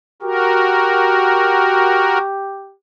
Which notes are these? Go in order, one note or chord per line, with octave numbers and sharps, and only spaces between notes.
F#4 G4 A#4